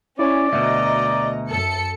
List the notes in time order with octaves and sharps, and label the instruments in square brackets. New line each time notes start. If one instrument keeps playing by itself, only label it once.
[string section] C#4 [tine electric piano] E4 C#5 G#5 [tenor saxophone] D5
[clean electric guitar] D2 B2 [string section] D#5 A#5 [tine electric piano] E5
[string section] F#2 A4 C#7